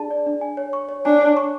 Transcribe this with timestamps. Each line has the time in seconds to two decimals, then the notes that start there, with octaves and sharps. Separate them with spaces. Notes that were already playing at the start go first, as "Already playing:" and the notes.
Already playing: D4 G#4 D5 A5
0.11 D5
0.26 D4
0.41 G#5
0.57 C#5
0.73 C#6
0.89 C#5
1.05 D4 G#5
1.21 C#5
1.37 C#6